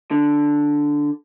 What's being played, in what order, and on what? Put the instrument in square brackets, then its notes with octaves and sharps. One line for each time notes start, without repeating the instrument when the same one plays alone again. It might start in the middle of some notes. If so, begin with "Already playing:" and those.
[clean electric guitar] D3